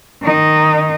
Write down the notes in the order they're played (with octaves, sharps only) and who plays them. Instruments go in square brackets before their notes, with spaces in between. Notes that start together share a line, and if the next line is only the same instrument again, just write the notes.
[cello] D#3 D#4